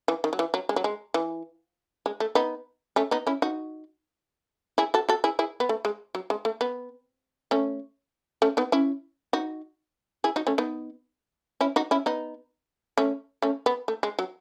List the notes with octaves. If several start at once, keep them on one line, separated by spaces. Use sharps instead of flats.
E3
D#3
F#3
E3
F#3
G#3
F#3
G#3
E3
G#3
A3
B3 D#4
A3 C#4
B3 D#4
C#4 E4
D#4 F#4
E4 G#4
F#4 A4
F#4 A4
E4 G#4
E4 G#4
B3
A3
G#3
F#3
G#3
A3
B3
A3 C#4
A3 C#4
B3 D#4
C#4 E4
D#4 F#4
E4 G#4
D#4 F#4
A3 C#4
B3 D#4
C#4 E4
D#4 F#4
C#4 E4
B3 D#4
A3 C#4
A3 C#4
B3
A3
G#3
F#3